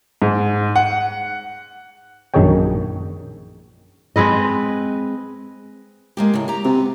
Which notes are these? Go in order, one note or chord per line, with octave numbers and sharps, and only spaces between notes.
G#2
F#5
A#1 F#2 D#3 G#4 C#5 G5
G#3 C4 B4 D#5
G#3 A#3 G4
A2 C#3
G4 A#5
C3 B3